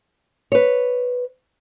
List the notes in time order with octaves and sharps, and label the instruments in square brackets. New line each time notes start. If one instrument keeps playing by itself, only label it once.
[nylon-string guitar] B4 C#5